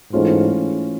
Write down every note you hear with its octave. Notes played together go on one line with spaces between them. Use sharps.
G#2 E3 A3 C#4 F4